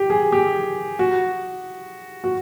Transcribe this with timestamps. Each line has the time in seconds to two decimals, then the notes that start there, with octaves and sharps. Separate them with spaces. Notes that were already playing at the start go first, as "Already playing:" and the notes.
Already playing: G4
0.10 G#4
0.32 G4
0.99 F#4
2.24 F#4